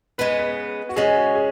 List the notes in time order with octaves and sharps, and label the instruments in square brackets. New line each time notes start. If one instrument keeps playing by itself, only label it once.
[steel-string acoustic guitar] C#3 G#3 B3 [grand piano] B4
[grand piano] B4
F#4
[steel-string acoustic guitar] C#3 G#3 C#4 [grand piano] G#4
[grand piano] F#4
G#4